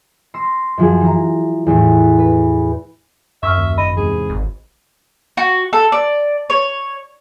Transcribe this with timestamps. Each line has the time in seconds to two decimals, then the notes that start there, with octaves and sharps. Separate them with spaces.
0.34 C6 E6 A#6
0.78 F#2 F3 G#4
1.01 E3 A#5
1.66 E2 A2
2.18 B4
3.43 F#2 E5 C#6 E6 F6
3.58 D#2
3.78 G#1 D#5 B5
3.96 E2 G#2 C3 G#4
4.30 G#1
5.37 F#4
5.73 A4
5.92 D5
6.50 C#5